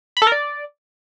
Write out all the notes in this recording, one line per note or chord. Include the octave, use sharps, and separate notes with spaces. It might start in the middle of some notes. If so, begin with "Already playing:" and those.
B5
A4
A#4
D5